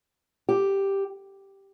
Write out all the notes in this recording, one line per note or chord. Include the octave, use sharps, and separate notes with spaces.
G4